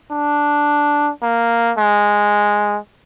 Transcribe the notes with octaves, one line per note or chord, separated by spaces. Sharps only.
D4
A#3
G#3